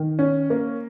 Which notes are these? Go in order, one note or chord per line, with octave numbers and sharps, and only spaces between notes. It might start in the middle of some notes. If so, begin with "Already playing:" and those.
Already playing: D#3
C#4
A#3